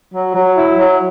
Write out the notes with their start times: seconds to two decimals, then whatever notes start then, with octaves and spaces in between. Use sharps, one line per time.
0.12 F#3
0.34 F#3
0.56 E4
0.79 F#3